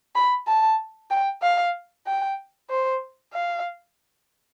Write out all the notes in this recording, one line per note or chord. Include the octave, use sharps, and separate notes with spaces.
B5
A5
G5
F5
G5
C5
F5